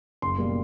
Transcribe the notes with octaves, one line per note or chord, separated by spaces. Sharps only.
F#1 C6
B2 G3 A#3